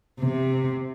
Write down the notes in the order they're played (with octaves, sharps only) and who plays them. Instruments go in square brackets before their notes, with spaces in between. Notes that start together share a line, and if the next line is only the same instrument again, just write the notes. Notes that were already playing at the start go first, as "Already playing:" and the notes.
[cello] C3